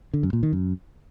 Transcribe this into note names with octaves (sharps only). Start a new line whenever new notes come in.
D3
F#2
A#2
D#3
F#2